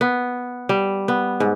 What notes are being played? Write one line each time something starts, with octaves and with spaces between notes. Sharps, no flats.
B3
G3
B3
G#2